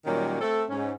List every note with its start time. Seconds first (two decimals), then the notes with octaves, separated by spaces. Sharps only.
0.05 A#2 D#3 F#3 G3 C#4
0.41 A3 C4 A4
0.69 G#2 C#4